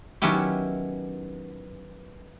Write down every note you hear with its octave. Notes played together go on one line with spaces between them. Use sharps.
D#3 F#3 B3 C#4 E4 G4